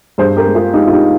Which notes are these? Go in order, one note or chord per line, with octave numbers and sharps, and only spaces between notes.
G2 G#4 C5
G4 A#4
G#3
F4 G#4
G#3 D#4 G4
F4
D#4 G4